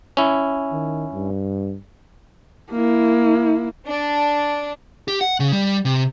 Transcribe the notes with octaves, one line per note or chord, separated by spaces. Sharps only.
C#4 E4
D#3
G2
A#3 E4
D4
G4
F#5
C#3
G3
C3